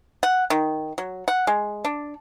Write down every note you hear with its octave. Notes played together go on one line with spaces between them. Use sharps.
F#5
D#3
F#3
F#5
G#3
D4